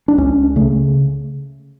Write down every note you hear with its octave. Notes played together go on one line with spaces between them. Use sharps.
D4
C#2 C#4
C#3 A3